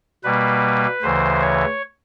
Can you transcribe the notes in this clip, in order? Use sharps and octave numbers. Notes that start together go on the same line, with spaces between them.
B2 G3 A#3 B4
D2 C#3 E3 C5
C#5